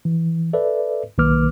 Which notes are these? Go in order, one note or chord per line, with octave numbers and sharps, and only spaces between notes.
E3
A4 B4 D5 E5
B1 D#3 A#3 B4 D6 F6